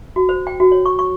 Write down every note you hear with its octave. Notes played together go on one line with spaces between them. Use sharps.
F#4
C5
G5
F#4
C#5
C#6
C#6